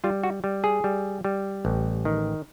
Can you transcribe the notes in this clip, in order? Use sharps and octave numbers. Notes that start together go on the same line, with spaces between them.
G3 F4
F#4
G3
G#4
G3
G3
A1
D#3